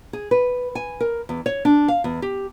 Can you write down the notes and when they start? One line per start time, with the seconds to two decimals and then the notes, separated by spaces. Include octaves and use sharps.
0.13 G#4
0.31 B4
0.75 G#5
1.00 A#4
1.29 E2
1.46 C#5
1.65 D4
1.88 F5
2.04 E2
2.22 G4